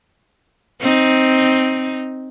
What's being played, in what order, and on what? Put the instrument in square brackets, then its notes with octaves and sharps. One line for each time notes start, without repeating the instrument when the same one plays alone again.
[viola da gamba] C4 D#4